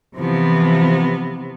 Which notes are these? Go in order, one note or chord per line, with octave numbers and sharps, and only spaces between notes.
C3 E3 F3 B3